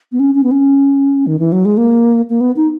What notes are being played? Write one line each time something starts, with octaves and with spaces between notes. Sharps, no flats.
B3
C#4
C#4
B3
C#4
D#3
E3
F#3
G#3
A#3
A#3
B3
D#4